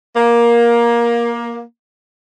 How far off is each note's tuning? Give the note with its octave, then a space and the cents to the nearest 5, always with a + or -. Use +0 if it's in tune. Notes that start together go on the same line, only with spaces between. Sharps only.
A#3 +15